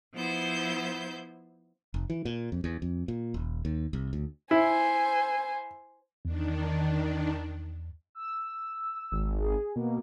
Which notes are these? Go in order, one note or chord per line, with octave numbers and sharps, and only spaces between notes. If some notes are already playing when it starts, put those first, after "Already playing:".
F3 B3 E4 C5 G6
F1
E3
A#2
F2
E2
F2
A#2
D#1
D#2
C2
D2
E4 C5 G#5
E2 D#3 D4
E6
G#1
G#4
B2 A#3